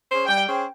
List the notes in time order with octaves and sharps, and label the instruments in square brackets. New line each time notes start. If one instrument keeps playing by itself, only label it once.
[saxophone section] C#4 G#4 C5
[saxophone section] G3 [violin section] G5
[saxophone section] C#4 G#4 C5